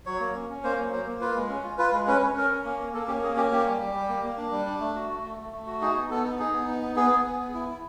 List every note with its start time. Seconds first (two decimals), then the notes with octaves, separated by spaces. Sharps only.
0.06 F#3 C#5
0.20 A#3
0.35 C#4
0.49 C#4
0.64 A#3 C5
0.77 F#3
0.92 A#3 C5
1.07 A#3
1.21 F4 B4
1.36 G#3
1.49 C#4
1.64 F4
1.78 F4 B4
1.92 G#3
2.07 C#4 B4
2.22 C#4
2.36 C#4 A#4
2.50 C#4
2.65 A#3
2.80 A#3
2.94 A#3 A4
3.08 C#4 G4
3.22 A#3 G#4
3.37 C#4 G4
3.51 A#3 G4
3.66 G3
3.80 G3
3.94 G3
4.08 A#3
4.23 A#3
4.38 D4
4.52 G3
4.66 D4
4.80 A3
4.95 F#4
5.09 A3
5.23 A3
5.38 A3
5.52 A3
5.67 F#4
5.81 D#4 G#4
5.95 B3
6.10 B3 A4
6.24 D#4
6.39 D#4 G#4
6.53 B3
6.67 D#4
6.82 B3
6.96 B3 G#4
7.11 B3
7.25 B3
7.39 B3
7.54 E4
7.68 E4